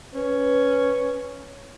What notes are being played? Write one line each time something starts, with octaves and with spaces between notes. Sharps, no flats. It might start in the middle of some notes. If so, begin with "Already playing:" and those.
C#4 B4